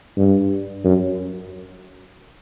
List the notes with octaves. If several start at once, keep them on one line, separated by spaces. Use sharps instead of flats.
G2
F#2